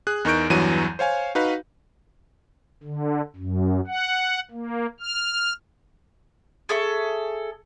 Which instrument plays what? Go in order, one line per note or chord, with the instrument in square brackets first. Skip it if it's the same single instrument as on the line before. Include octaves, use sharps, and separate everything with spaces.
[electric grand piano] G#4 F#6
E2 D#4 A#4 C#6 G6 D7
E2 G2 E3 F#3 D#7
C5 C#5 F5 G#5
D#4 F#4 B4 F5
[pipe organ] D3
F#2
F#5
A#3
F6
[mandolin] G#4 A4 E5 C#6